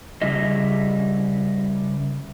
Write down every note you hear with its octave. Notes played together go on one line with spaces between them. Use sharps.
C#3 G3 E4 D#5